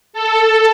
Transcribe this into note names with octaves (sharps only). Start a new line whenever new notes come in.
A4